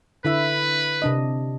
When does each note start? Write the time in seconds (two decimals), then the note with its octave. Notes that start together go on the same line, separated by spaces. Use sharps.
0.25 D3 E4 B4 E5
1.02 C3 D4 D#5